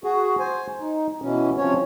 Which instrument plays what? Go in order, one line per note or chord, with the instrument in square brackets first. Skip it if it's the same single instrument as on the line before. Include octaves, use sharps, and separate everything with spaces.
[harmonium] F#4 G#4
C5 G#5
D#4
B2 E3 C#4
C3 F3 C#4 C#5